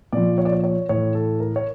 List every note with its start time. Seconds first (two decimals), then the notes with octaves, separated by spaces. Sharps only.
0.12 A#2 F3 D5
0.38 C#5
0.45 D5
0.52 C#5
0.64 C#5
0.89 A2 E3 C#5
1.15 A4
1.40 A#4
1.56 C#5